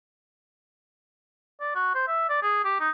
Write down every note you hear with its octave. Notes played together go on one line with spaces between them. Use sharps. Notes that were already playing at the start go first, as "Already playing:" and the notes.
D5
F#4
C5
E5
D5
G#4
G4
D#4